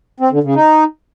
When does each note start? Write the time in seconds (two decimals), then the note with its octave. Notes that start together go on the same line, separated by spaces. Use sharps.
0.20 C4
0.32 D3
0.43 C#3
0.55 D#4